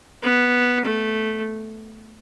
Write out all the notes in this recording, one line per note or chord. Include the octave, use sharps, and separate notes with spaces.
B3
A3